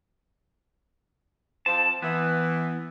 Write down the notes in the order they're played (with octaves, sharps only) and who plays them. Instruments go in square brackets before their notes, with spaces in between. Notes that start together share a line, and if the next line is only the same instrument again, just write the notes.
[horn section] F3 C4 [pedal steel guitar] A5
[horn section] E3 [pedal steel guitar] B3